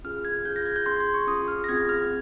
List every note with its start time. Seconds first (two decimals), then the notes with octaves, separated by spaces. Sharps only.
0.04 C#4 F4 G#4 F6
0.25 G#6
0.45 C#4 F4 G#4 G6
0.56 A#6
0.66 G#6
0.76 G6
0.86 C#4 G#4 C6
1.00 C6
1.14 C#6
1.27 C#4 F4 G#4 D#6
1.48 F6
1.64 A#6
1.69 C4 F4 G#4 G#6
1.89 F6